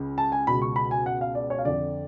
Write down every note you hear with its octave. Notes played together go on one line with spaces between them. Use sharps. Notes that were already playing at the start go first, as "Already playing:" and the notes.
Already playing: C#2 C#3
A5
G#5
C#2 B2 B5
C#6
B5
G#5
F#5
F5
D5
C#5
F5
F2 D3 D5